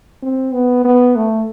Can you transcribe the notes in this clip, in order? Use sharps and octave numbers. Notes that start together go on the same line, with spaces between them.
C4
B3
B3
A3